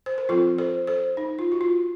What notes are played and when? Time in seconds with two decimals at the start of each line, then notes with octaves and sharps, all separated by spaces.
0.06 C5
0.18 A#4
0.29 F3 C4 F4 A4
0.58 A4 C5
0.87 A4 C5
1.17 D#4
1.39 F4
1.52 F#4
1.61 F4